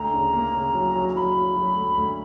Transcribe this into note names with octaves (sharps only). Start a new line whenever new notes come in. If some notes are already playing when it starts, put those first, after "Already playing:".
Already playing: D2 A#5
C#3
A#3
C#3
F#3
F#3
A#5
F#3 B5
F#3
F#3
D2
D2